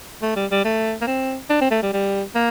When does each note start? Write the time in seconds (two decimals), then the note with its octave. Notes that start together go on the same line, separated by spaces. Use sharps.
0.22 A3
0.36 G3
0.51 G3
0.65 A3
1.01 A#3
1.07 C4
1.50 D4
1.61 C4
1.71 A3
1.83 G3
1.93 G3
2.35 A#3